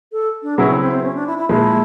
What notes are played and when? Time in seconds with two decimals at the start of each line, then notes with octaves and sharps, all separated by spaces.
0.12 A4
0.43 D4
0.58 C#3 F#3 B3 C#4 E4
0.69 C4
0.81 C4
0.92 C4
1.03 C#4
1.15 D4
1.27 E4
1.38 E4
1.49 A#2 F3 G#3 E4